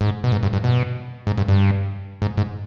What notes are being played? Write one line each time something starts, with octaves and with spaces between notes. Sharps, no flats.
G#2
B2
G#2
G2
G2
B2
G#2
G2
G2
G#2
G#2